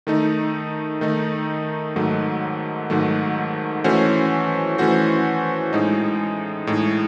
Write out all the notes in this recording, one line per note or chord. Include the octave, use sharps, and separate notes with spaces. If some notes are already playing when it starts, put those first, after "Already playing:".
D#3 A3 D#4
D#3 A3 D#4
G#2 D#3 F#3 A3
G#2 D#3 F#3 A3
E3 A3 C#4 F#4 C5
E3 A3 C#4 F#4 C5
A2 G#3 D#4
A2 G#3 D#4